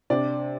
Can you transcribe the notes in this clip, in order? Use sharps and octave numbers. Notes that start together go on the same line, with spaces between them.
C3 D4 D5